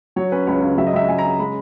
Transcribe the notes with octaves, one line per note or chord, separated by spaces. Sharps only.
F#3 C#5
C#4 B4
C#2 C#5
C#3
F#3 E5
D#5
C#2 E5
C#2 G#5
A#5
C#3
G#3 B5